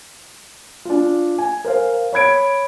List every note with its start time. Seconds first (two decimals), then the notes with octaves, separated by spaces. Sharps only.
0.85 D4 F4
1.38 G#5
1.65 A#4 C5 F5
2.13 C#5 B5 G#6 D7